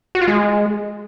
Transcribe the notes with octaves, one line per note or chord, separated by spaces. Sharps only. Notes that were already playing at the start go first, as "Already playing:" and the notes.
F#4
F4
G#3